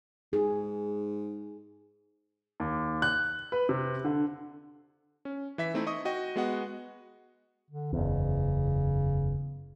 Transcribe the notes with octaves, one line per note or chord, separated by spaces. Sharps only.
G#2 G#4
D#2
F#6
B4
C3
D3
C#4
E3 E5 B6
A3 C4 D#4 E4
D#5 C#6 D#6
F#4 D#5 G5
G#3 B3 F#4 D#5 F#5
D3
F#1 E2 C#3